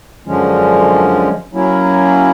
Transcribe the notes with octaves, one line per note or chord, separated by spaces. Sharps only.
F#2 D3 F3 G#3 C#4
F#3 A#3 C#4 E4